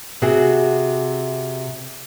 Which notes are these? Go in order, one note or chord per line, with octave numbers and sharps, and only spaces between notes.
C3 F#4 G#4